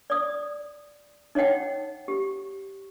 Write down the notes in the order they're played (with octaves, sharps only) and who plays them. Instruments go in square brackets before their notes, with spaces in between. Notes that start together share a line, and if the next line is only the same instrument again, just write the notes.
[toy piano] D5 D#6
D#4 C#5 D#5 F#5 G5
G4